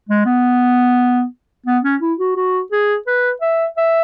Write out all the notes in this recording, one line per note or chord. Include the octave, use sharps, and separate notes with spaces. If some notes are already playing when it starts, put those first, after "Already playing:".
G#3
B3
B3
C#4
E4
F#4
F#4
G#4
B4
E5
E5